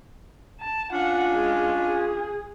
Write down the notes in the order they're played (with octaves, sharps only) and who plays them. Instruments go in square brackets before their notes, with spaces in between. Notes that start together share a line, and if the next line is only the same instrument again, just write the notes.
[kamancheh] A5
[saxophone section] C#4 D4 F4 [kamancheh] F#5
[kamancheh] G#3
G#4